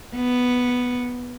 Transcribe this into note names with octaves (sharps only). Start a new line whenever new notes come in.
B3